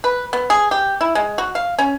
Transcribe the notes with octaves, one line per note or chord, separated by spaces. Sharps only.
B4
B3
G#4
G4
E4
G#3
F#4
F5
C#4